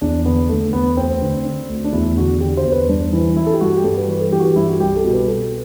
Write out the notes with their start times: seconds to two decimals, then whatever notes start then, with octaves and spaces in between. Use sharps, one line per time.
0.01 E2 D4
0.25 D3 B3
0.49 D3 A3
0.73 E2 B3
0.97 D2 C4
1.22 D3
1.45 D3
1.69 D2
1.84 D4
1.93 E2 E4
2.17 D3 F#4
2.40 D3 G4
2.57 C5
2.64 E2
2.72 B4
2.89 G2 D4
3.13 E3 E4
3.36 E3 E4
3.47 A4
3.53 G4
3.61 G2 F#4
3.77 G4
3.84 G2 A4
3.97 B4
4.08 E3 B4
4.21 A4
4.32 E3 G4
4.40 F#4
4.45 G4
4.56 G2 E4
4.69 F#4
4.80 C2 G4
4.96 A4
5.04 B2
5.12 B4
5.28 B2 A4